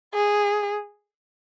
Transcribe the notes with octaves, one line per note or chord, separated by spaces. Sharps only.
G#4